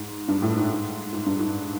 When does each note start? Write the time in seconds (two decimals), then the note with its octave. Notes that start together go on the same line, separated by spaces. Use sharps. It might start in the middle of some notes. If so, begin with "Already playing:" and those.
Already playing: G#2
0.28 G2
0.42 A2
0.56 G#2
0.70 G#2
1.13 G#2
1.26 G2
1.39 G#2